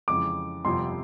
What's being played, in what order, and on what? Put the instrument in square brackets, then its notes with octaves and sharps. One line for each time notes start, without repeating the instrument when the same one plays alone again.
[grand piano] F2 C#3 E3 G#3 [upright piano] D6
[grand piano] G1 F2 C3 F3 [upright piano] C6